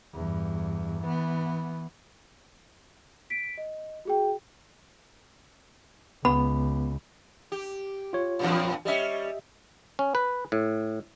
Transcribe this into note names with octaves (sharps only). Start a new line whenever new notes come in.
E2 G2
E3 B3
B6 D7
D#5
F#4 G#4 G5
C#2 B3 B5
G4
F4 C#5
E2 G2 A#2
G3 C#4 G4 D#5 E5
C#4
B4
A2